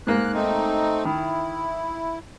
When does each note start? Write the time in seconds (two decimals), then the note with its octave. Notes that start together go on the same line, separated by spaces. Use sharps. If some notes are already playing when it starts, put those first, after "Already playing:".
0.07 G#2 A#3 F#6
0.34 A3 C4 D#4
1.05 D#3 E4